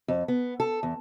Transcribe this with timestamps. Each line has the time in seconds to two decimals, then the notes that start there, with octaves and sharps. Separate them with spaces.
0.08 F2
0.28 B3
0.60 A4
0.83 E2